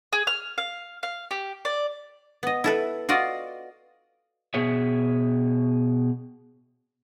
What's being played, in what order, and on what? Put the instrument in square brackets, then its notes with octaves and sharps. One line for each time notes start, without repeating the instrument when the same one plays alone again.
[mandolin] G#4
F6
F5
F5
G4
D5
[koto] B3 D#5
E4 A4 B4
F4 F#4 D5 D#5
[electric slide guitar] B2 G#4 C#5 E5